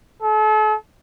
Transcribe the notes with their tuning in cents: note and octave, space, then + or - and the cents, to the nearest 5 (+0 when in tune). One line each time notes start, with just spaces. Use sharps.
A4 -40